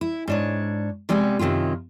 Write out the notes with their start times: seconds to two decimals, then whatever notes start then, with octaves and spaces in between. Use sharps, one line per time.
0.01 E4
0.28 G#2 D4 C#5
1.09 C3 G3 G#3 B3
1.39 F#2 C3 D#3 E4 F4